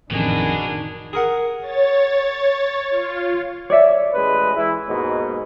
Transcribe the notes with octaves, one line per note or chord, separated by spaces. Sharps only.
A1 F2 B2 D#3 D4 G#4
G#4 A#4 F#5
C#5 A6
F4
C#5 D5 E5
A1 G#3 B4
E3 E4
D#2 G#2 B2